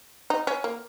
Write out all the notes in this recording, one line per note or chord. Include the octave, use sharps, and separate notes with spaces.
D#4
C#4
A#3